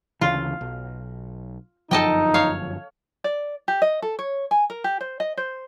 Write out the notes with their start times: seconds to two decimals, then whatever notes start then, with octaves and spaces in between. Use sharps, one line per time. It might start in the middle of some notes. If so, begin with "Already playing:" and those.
0.21 D2 C#3 E3 F4
0.61 B1
1.91 G1 F#2 F3 D#4 A4 D#5 G5
2.34 C#5 F5
3.24 D5
3.68 G4
3.82 D#5
4.02 A4
4.19 C#5
4.51 G#5
4.70 A#4
4.84 G4
5.01 C5
5.20 D#5
5.37 C5